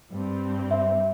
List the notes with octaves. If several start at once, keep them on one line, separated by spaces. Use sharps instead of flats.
G2 C4
E5